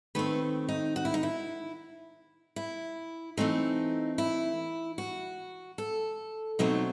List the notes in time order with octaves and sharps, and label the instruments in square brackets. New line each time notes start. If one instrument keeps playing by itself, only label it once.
[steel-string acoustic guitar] D#3 A3 C4 B4
D#4
F#4
E4
D#4
E4
E4
E3 A3 C4 D#4
E4
F#4
A4
B2 F#3 A3 C4 D#4